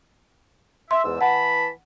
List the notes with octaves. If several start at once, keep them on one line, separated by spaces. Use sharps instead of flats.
E5 C6
E2 G#2 E6
E3 F#5 A5 B5